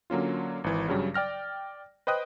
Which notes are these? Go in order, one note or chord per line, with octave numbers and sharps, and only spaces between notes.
D3 F#3 A#3 C#4 F4
G#1 E3
G2 C#3 F#3 G3
D5 G5 F6 A#6
B4 C5 D#5 G5 D#6 F#6